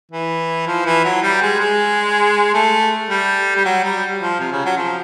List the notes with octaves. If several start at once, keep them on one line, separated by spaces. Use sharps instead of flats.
E3
F3
E3
F#3
G3
G#3
G#3
A3
G3
G3
F#3
G3
F3
C3
C#3
F#3
F3